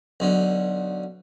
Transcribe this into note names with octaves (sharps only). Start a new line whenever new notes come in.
B1 D3